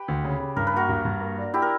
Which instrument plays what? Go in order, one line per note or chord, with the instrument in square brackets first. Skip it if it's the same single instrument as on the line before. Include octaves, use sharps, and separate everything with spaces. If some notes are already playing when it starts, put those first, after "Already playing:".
Already playing: [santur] G4 B4
[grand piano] D2
C#3
C#3
[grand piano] G2 [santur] A#4
[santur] B4
[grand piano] A#3 [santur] F#4 A#4
[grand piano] G2
G2
A#3
D4
[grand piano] D4 [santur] E4 G4
[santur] A#4